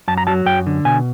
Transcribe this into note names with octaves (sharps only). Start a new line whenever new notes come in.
F#2 A5
A#5
F#3 A5
F#2 G5
D3
B2 G#5